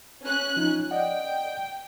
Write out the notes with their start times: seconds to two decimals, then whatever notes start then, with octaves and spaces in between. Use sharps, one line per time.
0.23 C#4 F#6
0.56 F3 D#4 F4
0.91 D5 D#5 F#5 G5